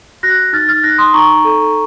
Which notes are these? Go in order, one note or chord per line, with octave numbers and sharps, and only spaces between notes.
F#4 F#6 A#6
D#4 F6 A6
F6 A6
D#4 F#6 A#6
C6 D#6
D#4 A#5 C#6
A4